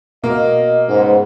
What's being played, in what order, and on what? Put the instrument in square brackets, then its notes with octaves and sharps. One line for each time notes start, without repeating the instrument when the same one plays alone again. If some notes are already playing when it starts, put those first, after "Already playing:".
[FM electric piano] B2 B3 F#4 [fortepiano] A#3 [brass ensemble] D#5
[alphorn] G#2 [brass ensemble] C#3 B3 F#5 [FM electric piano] A#4 C5